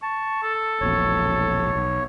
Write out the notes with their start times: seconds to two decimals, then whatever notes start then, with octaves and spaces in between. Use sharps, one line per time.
0.02 A5 C#6
0.43 A4
0.81 E1 A#1 B2 C#5
1.75 B1